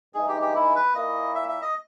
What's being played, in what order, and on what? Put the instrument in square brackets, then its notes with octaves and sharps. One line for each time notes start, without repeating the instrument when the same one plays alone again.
[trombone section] G2 E3 G#3 D#4 [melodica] G#4
[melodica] G4
G4
E4
B4
[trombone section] A#2 A#3 E4 [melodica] D#5
[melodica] E5
E5
D#5